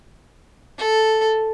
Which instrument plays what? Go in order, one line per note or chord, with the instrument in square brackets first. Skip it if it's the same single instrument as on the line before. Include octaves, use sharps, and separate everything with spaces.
[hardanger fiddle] A4